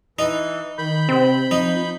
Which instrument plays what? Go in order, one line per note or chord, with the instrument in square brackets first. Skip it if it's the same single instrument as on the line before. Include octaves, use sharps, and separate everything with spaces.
[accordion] E3 [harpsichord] D#4
[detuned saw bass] D#3 [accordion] B5 G6
[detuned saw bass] C3 [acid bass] C4
[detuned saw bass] F3 [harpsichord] D#4